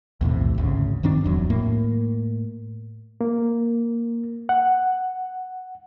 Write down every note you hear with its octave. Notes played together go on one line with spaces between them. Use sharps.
B1 E2 A2 C3
G#1 D2 C#3
G2 D#3 C4 D4
D1 E2 F#3
A2 A#3
A#3
F#5